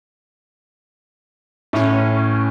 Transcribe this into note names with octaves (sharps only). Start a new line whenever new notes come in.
A2 C#4